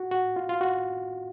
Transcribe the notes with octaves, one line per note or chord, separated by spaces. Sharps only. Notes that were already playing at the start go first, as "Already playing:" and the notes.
Already playing: F#4
F#4
F4
F4
F#4